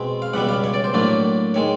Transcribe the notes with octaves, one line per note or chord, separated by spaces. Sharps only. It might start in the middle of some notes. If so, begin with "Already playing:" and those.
Already playing: B2 G#3 C4
F5
C#2 B2 G3 B3 F#5
F5
C#5
D5
C5
A2 F#3 A#3 D4
D#3 G#3 C#5